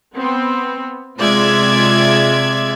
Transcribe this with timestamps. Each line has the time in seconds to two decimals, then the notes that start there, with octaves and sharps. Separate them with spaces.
0.15 B3 C4
1.18 C3 G#3 F4 D5 E5 G#6